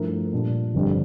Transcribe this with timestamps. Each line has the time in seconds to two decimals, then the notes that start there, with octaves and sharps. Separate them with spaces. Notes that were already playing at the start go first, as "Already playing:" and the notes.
Already playing: G2 F3 A3 E4 A#4
0.33 A#2 G3 D4
0.74 G1 F2 D3 G3